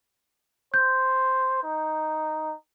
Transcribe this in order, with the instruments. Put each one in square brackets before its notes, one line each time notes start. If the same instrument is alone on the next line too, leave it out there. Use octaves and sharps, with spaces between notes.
[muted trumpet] C5 [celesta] G6
[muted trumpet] D#4